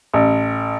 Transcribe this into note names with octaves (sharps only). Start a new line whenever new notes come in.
A1